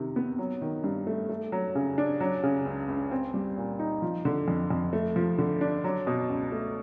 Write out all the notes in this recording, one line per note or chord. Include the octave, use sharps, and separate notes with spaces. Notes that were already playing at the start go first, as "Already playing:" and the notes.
Already playing: C3 D#3
B3
F#3
D#3
G2
A3
A3
F#3
C#3
D4
F#3
C#3
C#2
C#2
C4
G3
A#2
D#4
F3
D3
F2
F2
A3
F3
D3
D4
F#3
B2
C#2
A3